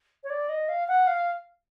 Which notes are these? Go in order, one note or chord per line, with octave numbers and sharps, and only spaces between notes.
C#5
D5
D#5
F5
F#5
F5